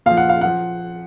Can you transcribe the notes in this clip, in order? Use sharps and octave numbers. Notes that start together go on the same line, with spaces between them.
A#2 F3 F5
F#5
F5
F3 F#5